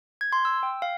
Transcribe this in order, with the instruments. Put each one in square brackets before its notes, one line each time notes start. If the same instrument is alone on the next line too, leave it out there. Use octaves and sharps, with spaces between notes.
[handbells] G#6
C6
E6
G5
F5